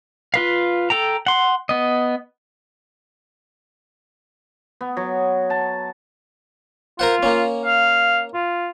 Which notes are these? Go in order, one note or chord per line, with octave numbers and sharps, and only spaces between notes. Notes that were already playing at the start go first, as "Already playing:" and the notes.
F4 B4 F5
A4 G5 A#5
F#5 C6
B3 D#5
B3
F#3
A5
F4 A#4 C5 F#5
A#3 C#4
F5
F4